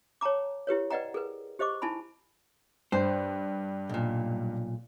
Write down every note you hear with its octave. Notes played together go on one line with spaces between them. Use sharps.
C#5 G5 A5 A#5 D6
E4 G4 B4 C#5
B4 D5 D#5 F#5 G5 A#5
G#4 A#4 B4
G4 C5 D#5 C#6 D6
D#4 E4 G#5 A5 B5
G2 C5
B1 A#2